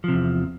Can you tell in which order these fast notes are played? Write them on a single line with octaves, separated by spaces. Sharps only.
F3 C3 E2